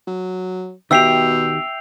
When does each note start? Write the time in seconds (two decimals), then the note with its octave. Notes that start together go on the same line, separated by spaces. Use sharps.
0.08 F#3
0.91 B2 D#3 G4 E5 G5 E6 C7 F7